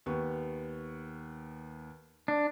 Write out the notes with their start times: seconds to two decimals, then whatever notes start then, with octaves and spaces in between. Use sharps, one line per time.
0.06 D#2 B3 C#6
2.28 D4